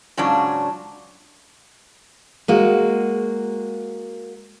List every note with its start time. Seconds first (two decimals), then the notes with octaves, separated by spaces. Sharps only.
0.17 G#2 C#3 F#3 C#4 D4 F4
2.48 G#3 A#3 F#4